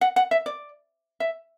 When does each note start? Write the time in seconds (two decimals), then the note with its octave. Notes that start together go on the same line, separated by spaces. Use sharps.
0.01 F#5
0.16 F#5
0.31 E5
0.46 D5
1.20 E5